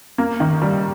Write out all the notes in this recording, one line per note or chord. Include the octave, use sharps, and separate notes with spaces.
A#3
D#3
G3